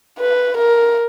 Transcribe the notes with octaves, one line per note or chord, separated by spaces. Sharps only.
B4
A#4